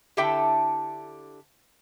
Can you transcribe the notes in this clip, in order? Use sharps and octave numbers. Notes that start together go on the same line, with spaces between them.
D3 E4 G4 A4 E5 G5